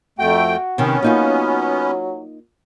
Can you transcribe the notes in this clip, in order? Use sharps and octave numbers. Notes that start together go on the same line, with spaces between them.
F2 A3 F#4 G5
C3 D#3 B3 C#4
F#3 A#3 D#4 F4